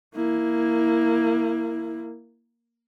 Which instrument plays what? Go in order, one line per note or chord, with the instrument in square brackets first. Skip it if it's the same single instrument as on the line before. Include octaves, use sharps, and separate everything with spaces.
[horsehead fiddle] A#3 E4